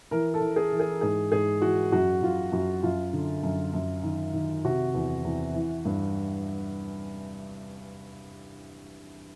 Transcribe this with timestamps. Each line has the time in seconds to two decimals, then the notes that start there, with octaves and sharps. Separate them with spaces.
0.11 E3 A#4
0.34 A4
0.41 E3
0.56 G#4
0.72 E3
0.80 G#4
1.01 G#2 G#4
1.32 G#2 G#4
1.62 E3 F#4
1.92 F#2 F#4
2.22 F#2 F4
2.52 F#2 F#4
2.83 F#2 F4
3.13 D3
3.43 F#2
3.74 F#2
4.03 D#3
4.34 D#3
4.65 C3 F#4
4.94 E2
5.24 E2
5.54 E3
5.85 G2